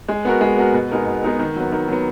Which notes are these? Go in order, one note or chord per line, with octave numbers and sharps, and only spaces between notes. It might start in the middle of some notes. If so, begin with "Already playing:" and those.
G#3
B3 F#4 A#4
G#3
B3 F#4 A#4
B2
G#3 B3 D#4 A#4
B2
G#3 B3 D#4 A#4
D#3
F#3 B3
D#3
F#3 B3